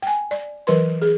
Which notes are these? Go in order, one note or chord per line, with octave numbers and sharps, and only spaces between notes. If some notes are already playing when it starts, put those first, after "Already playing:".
G5 G#5
D5
E3 F#3 A#4 B4 C6
G#4